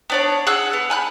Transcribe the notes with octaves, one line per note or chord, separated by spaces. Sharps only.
B3 D4 C#5
G#4 F#5 E6 F#6
B3
G#5 B5 F#6